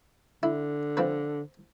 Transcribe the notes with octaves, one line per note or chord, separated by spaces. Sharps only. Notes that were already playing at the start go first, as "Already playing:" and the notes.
D3 E4
F3 C4 B4